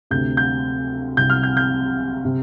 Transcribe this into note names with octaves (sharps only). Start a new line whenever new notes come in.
D2 C3 G6
G6
C2 C3 G6
F6
G6
G6
C3